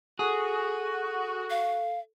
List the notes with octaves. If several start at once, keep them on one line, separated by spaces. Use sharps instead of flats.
F#4 G#4 A4
F5